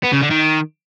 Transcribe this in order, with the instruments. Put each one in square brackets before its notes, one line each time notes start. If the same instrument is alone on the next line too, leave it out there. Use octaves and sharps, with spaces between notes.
[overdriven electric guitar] B3
C#3
D3
D#3